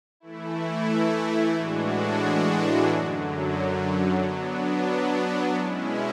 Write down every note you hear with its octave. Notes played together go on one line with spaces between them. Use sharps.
E3 A3 E4
A2 E3 G#3 D4 F#4
F#2 D3 F#3
F#3 B3 D4
B2 G#3 C#4 E4